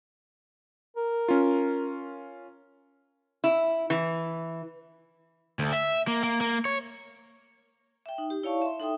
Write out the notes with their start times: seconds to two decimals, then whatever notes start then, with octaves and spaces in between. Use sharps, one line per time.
0.97 A#4
1.28 C#4 F4
3.44 E4
3.90 E3
5.59 D2
5.73 E5
6.08 A#3
6.23 A#3
6.41 A#3
6.65 C#5
8.06 E5 G5
8.18 D#4
8.30 G4
8.43 E4 C#5 D5 F5 A5 C#6
8.62 E5 C6
8.80 D#4 A4 E5 G5 D#6